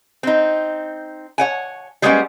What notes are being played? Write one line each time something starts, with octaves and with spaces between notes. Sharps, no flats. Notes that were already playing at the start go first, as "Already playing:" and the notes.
C4 D#4
C#5 F#5 G#5
G3 G#3 A#3 B3 C#4 F#5